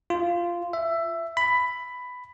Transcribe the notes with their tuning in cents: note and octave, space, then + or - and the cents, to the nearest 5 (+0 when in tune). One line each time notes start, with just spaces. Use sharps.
F4 -10
E5 +15
B5 +10